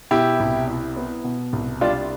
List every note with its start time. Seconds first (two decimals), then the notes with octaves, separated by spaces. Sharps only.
0.11 B2 E4 G4
0.40 C2
0.67 E4
0.96 B3
1.24 B2
1.53 C2
1.81 G3 D4 F4